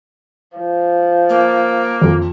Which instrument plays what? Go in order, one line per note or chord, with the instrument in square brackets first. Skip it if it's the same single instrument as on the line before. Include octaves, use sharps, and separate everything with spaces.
[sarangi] F3
[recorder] A#3
[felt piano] F2